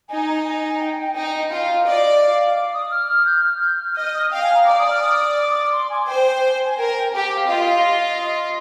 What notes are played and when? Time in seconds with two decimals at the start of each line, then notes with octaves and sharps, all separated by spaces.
0.09 D#4 G#5
0.27 A#5
0.45 G#5
0.80 G5
0.97 G5
1.15 D#4 G5
1.32 G5
1.50 F4 F5
1.85 D5 D#5
2.21 F5
2.55 D6
2.74 D#6
2.91 F6
3.26 G6
3.44 F6
3.61 G6
3.79 F6
3.96 D#5 F6
4.14 D#6
4.31 F5 G5
4.43 G#5
4.55 A#5
4.66 D5 D6
4.79 D#6
4.90 F6
5.01 D#6
5.37 D6
5.72 C6
5.90 G#5
6.06 C5 G5
6.65 G#5
6.77 A#4 G5
6.95 G5
7.12 G4 G5
7.24 G5
7.36 F5
7.47 F4 D#5
7.65 D#5